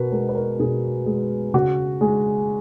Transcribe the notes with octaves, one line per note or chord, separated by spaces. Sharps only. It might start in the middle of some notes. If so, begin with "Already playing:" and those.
Already playing: B2 A#4 B4
G#3 A#4
B4
A#4
B2 G#4
G#3
C#3 F#4
G#3